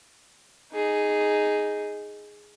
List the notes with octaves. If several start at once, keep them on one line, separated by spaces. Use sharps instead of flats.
D#4 G#4